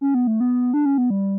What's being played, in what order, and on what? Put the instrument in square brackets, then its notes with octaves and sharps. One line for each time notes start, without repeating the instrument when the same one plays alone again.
[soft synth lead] C#4
B3
A3
B3
D4
C#4
B3
G3